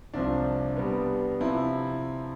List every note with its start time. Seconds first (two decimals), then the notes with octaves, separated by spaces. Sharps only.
0.14 C2 C3 F3 D4
0.77 B2 G3 B3
1.41 C3 F3 E4